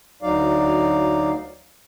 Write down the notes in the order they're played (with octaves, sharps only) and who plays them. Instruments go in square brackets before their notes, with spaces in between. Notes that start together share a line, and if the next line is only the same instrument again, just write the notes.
[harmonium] D2 F#3 D#4 D5 F5